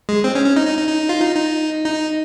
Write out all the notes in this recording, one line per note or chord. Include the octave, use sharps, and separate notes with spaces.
G#3
C4
C#4
C#4
D#4
D#4
D#4
D#4
F4
D#4
D#4
D#4